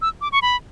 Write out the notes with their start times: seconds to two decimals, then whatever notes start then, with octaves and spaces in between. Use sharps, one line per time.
0.02 E6
0.21 D6
0.32 C#6
0.42 B5